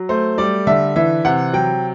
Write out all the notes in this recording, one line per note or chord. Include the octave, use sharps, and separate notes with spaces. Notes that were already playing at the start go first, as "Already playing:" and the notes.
Already playing: F#3
A3 C5
G3 D5
D3 E5
E3 E5
C3 F#5
F#3 G5